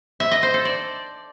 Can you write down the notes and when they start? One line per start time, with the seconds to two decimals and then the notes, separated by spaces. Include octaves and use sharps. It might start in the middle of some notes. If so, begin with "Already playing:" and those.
0.20 E5
0.31 D#5
0.43 C5
0.54 A4
0.65 D5